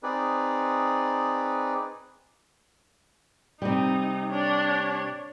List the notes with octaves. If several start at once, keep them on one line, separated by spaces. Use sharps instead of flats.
C4 D#4 G#4 B4 D5
C3 G3 D#4
D4 C#5